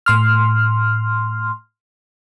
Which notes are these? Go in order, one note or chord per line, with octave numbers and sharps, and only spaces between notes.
A2 C6 F6